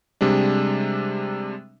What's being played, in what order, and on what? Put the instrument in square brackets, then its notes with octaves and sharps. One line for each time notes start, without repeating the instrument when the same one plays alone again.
[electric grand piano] C3 G3 G#3 D4